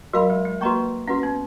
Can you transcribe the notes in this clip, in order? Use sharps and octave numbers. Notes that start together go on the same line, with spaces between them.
F#3 F#4 A#4 F5 B5
G#3
G#3
A#3 F#4 B4 D#5 A#5 C#6
C#4 F#4 B4 F#5
B3